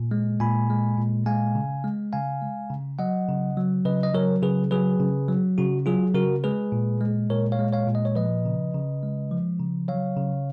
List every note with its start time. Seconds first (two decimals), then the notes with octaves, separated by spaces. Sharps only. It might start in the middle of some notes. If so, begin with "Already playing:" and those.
Already playing: A#2
0.11 G#3
0.40 A#2 G#5 B5
0.70 G#3
0.97 A#2
1.26 G#3 F5 G#5
1.55 C#3
1.84 G#3
2.13 C#3 F5 G#5
2.42 G#3
2.70 C#3
2.99 F#3 D#5 F#5
3.28 C#3
3.57 F#3
3.85 C#3 B4 D#5
4.03 D#5
4.14 F#3 A#4 C#5
4.43 C#3 G#4 B4
4.71 F#3 G#4 B4
5.00 C#3
5.28 F#3
5.58 C#3 F#4
5.86 F#3 F4 G#4
6.14 C#3 F#4 A#4
6.44 G#3 G#4 B4
6.72 A#2
7.01 G#3
7.29 A#2 A#4 C#5
7.52 C#5 F5
7.59 G#3
7.72 C#5 F5
7.88 A#2
7.95 D#5
8.05 C#5
8.15 F3 B4 D#5
8.45 C#3
8.74 C#3
9.03 G#3
9.31 F3
9.59 C#3
9.88 F#3 C#5 F5
10.17 C#3